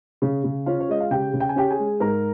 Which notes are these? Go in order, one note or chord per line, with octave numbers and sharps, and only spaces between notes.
C#3
C#3
C#4 F4 F5
C#5
G#3 D#5
F5
C#3 G4 G5
C#3
G5
G#5
C#4 G4 G5
G#4 G#5
G#3
G#2 A#4 A#5